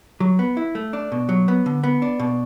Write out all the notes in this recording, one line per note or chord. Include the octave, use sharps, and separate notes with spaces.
F#3
B3
E4
A3
D4
B2
F#3
B3
D3
B3
D4
B2